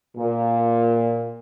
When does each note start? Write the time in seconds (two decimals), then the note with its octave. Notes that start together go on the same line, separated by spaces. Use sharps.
0.17 A#2